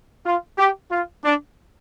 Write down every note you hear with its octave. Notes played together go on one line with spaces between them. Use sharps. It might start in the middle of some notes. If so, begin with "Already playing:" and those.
F4
G4
F4
D4